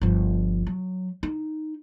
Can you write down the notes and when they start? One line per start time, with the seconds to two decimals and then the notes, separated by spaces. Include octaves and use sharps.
0.02 G1 F3
0.67 F#3
1.23 D#4